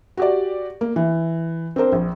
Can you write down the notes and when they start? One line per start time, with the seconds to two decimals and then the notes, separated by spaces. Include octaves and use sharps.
0.17 F#4 G4 D5
0.81 A#3
0.96 E3
1.76 C4 D4 A#4 C5
1.92 A#1